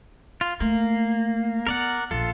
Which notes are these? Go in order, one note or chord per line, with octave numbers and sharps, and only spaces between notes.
F4
A3 A#3
B3 A#4 D5 F#5
A#1 F4 A4